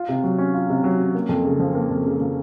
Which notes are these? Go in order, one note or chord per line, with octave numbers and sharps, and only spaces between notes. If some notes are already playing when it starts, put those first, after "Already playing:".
Already playing: F4
C3
F#3
C#4
F4
C3
F#3
C#4
A#3
F2
C#3
F3
A#3
F2
C#3
F3